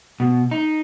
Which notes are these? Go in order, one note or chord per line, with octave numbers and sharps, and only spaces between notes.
B2
D#4